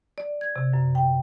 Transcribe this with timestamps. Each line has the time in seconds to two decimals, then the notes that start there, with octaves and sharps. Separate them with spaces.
0.18 D5
0.41 G#6
0.56 C3
0.73 F#2
0.95 G5